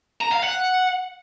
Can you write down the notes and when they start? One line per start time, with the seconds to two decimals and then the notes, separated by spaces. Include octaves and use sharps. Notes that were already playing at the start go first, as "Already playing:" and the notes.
0.21 A#5
0.32 F5
0.43 F#5